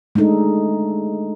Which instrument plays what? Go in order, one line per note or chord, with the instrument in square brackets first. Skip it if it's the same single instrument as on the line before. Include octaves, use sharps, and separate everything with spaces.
[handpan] G#3 A3 D4 D#4 A4